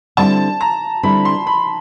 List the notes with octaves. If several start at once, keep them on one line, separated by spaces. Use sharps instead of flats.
D3 G3 C4 E4 A5
A#5
D3 G3 C4 E4 B5
C6
B5